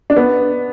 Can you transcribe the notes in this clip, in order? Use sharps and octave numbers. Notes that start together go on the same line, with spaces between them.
D4
B3